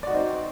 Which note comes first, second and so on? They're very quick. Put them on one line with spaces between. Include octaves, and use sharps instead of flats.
D5 F#4 D#4 C4